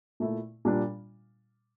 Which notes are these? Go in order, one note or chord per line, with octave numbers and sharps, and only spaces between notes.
A#2 A3 E4
A#2 G3 D4 F4